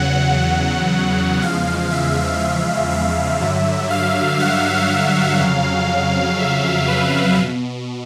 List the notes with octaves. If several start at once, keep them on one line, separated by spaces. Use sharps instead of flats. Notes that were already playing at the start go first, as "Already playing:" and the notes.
Already playing: E2 C#3 F#3 F#5
F#5
E2 C#3 F3 G#3 F5
E5
F5
E5
G2 D3 F#3
F5
F#5
F5
F2 C#3 F#3
E5
B4
B2